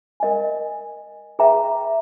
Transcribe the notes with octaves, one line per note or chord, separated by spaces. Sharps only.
A#4 D#5 G#5
G#4 B4 E5 G5 A#5